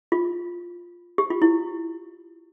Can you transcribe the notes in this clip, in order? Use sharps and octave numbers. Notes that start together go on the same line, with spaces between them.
F4
G4
F4
E4